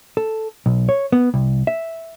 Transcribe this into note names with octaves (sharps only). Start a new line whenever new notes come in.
A4
B1
C#5
B3
C2
E5